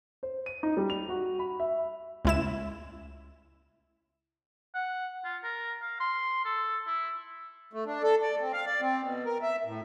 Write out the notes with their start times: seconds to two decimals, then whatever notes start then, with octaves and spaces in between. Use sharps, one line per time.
0.23 C5
0.46 D#7
0.63 D#4
0.77 G3
0.90 F7
1.09 F#4
1.39 B5
1.60 E5
2.25 C#2 E4 E7
4.75 F#5
5.24 F4
5.44 A#4
5.82 F5
6.00 C6
6.45 A4
6.87 E4
7.73 A3
7.86 D4
8.03 A4
8.22 D5
8.41 C4
8.53 F5
8.66 D5
8.81 C4
9.02 B2
9.26 A#4
9.42 E5
9.65 A2